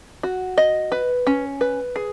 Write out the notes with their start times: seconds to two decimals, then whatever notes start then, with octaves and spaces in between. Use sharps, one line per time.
0.23 F#4
0.58 D#5
0.92 B4
1.27 C#4
1.61 B4
1.96 G#4